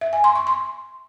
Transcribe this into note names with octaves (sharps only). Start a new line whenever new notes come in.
E5
G#5
C6
C#6
C6